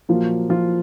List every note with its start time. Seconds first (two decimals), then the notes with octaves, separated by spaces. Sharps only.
0.09 A#2 F3 F#3 A#3 F4
0.49 F3 F4